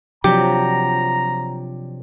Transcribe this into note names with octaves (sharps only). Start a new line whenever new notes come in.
C3 F3 F#3 D4 G4 A#5